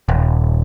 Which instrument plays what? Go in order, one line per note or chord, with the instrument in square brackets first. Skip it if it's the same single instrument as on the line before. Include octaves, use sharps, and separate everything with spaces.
[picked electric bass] D#1